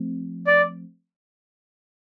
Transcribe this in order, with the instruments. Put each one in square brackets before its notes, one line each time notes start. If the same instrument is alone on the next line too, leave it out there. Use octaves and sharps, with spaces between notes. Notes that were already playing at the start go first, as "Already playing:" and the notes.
Already playing: [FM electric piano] F3 A3 C4
[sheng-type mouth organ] D5